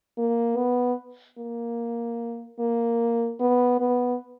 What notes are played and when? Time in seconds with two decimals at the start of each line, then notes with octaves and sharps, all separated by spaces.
0.18 A#3
0.57 B3
1.38 A#3
2.59 A#3
3.40 B3
3.80 B3